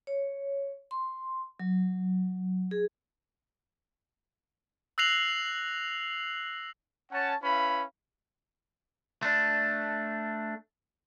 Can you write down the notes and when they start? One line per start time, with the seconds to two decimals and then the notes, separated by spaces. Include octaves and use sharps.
0.07 C#5
0.91 C6
1.60 F#3
2.71 G#4
4.98 E6 F#6 A#6 C7 F7 F#7
7.12 C#4 C#5 F#5 A5
7.43 C#4 E4 B4 F5 B5
9.22 A3 D4